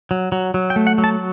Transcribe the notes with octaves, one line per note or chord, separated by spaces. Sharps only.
F#3
F#3
F#3
G5
A3
F#5
F#3
A5